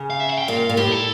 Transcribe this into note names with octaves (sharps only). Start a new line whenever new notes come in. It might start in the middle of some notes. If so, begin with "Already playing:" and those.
Already playing: C#3
F5
E5
F5
G5
A#2 F5
F5
A#2
A2 G4
A4